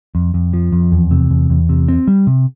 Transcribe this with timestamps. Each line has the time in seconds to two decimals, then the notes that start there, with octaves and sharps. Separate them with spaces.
0.15 F2
0.34 F2
0.53 F3
0.72 F2
0.92 E2
1.11 C3
1.30 E2
1.50 E2
1.69 C3
1.88 C4
2.08 G3
2.27 C3